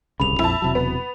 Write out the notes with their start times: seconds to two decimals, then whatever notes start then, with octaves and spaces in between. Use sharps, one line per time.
0.20 D1 C2 C#3 B5 F7
0.39 A#1 F2 E4 A5
0.62 E1 C3 F#3
0.75 B3